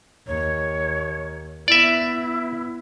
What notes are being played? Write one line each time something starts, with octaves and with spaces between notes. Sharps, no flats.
D#2 C#5
B3 E4 D5 E5